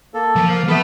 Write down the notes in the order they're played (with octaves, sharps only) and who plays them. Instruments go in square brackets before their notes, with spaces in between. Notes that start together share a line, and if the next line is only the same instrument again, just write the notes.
[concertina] A#3 A4
[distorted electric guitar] F3
[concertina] A#3 F5
[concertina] B3 B5 [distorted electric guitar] A4 E5